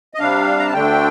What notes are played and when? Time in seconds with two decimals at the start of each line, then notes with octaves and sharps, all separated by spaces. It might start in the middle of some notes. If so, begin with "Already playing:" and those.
0.14 D#5
0.19 C3 G3 D4 F5
0.59 A#5
0.66 A5
0.74 D2 D3 A3 D4 G5